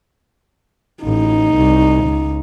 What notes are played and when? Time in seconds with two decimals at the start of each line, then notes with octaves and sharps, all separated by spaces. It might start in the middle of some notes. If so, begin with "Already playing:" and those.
1.04 A1 D#4
1.55 C2
2.04 C#2